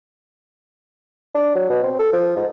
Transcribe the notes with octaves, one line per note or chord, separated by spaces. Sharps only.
D4
F#3
B2
C4
A4
F3
G#2